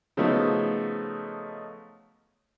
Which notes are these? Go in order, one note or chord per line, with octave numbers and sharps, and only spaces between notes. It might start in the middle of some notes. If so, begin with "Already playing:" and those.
C#3 F3 F#3 A3 B3 D#4